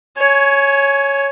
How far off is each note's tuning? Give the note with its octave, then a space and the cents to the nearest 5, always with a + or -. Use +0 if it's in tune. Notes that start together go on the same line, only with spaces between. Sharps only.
C#5 +0 G#5 +20